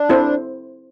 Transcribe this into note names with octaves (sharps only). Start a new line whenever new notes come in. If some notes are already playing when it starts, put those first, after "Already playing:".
Already playing: D4
C4 E4 A4 C5